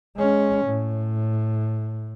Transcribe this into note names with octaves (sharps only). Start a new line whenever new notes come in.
G#3 C#4
A2